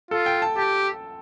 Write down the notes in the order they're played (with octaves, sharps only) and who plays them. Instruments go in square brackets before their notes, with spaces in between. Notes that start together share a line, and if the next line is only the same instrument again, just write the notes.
[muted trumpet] F4 [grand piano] A4
[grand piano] G5
A5
[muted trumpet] G4 [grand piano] A5